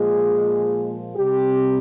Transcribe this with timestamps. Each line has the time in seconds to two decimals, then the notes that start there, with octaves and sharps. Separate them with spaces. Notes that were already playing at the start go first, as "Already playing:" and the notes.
Already playing: A#2 F3 G#3 G#4
1.15 C3 G3 G4